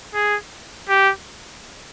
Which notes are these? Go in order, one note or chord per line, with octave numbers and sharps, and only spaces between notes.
G#4
G4